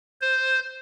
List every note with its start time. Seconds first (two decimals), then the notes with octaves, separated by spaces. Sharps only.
0.21 C5